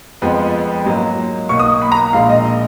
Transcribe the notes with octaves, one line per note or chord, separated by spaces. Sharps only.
F2 F3 G#3 B3
G#2 F#3 A#3
B1 B2 A#3 C#6
D#6
B5
A#5
A#1 A#2 G#3 F5
D#5
D#5